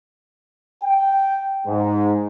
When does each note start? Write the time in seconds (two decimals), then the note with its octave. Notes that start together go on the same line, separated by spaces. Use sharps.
0.83 G5
1.67 G#2